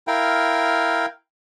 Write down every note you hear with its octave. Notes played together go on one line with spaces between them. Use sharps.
E4 A#4 F5 G5